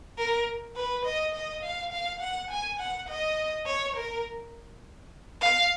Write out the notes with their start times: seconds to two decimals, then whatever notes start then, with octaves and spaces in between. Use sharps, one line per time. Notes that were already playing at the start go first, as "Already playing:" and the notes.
0.18 A#4
0.76 B4
1.05 D#5
1.34 D#5
1.63 F5
1.92 F5
2.21 F#5
2.50 G#5
2.79 F#5
3.09 D#5
3.66 C#5
3.96 A#4
5.41 F5